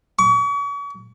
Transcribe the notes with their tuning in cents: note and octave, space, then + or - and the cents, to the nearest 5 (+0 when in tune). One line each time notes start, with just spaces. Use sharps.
C#6 +40